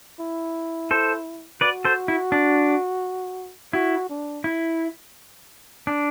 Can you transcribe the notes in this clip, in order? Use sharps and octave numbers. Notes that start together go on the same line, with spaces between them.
E4
A4 C5
F#4 B4 D5
A4 C5
E4
D4
E4 F#4
D4
E4
D4